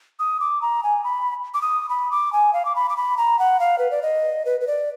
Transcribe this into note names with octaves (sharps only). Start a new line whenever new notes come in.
D#6
D6
A#5
G#5
B5
D6
D#6
B5
D6
G#5
F5
D6
B5
D6
B5
A#5
F#5
F5
B4
D5
D#5
B4
B4
D5